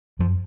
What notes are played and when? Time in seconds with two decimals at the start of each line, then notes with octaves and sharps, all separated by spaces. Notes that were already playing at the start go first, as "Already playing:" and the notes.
0.19 F#2 F3